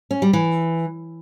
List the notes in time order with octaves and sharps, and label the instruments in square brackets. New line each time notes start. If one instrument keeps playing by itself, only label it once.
[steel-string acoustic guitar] C#4
G3
E3